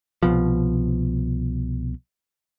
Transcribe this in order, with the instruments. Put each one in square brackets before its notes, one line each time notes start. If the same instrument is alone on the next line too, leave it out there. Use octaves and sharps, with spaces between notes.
[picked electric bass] C2 B2 F3